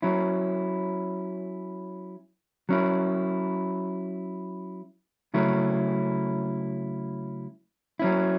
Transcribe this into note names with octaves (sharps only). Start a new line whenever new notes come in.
F#3 C#4 E4
F#3 C#4 E4
C#3 F#3 A3 C#4 E4
F#3 C#4 E4